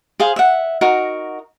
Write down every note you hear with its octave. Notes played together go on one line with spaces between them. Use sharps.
G#4 C5 F5
E5 F#5
D#4 F#4 A#4